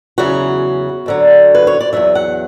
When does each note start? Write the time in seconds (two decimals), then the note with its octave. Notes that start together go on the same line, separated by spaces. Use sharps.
0.18 E2 C#3 F#3 F#4
1.06 D2 D3 F#3
1.55 B4
1.67 C#5
1.81 D5
1.93 E2 B2 F#3 E5
2.15 F#5